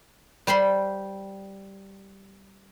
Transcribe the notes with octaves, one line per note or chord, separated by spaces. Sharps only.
G3 C5 B5 C6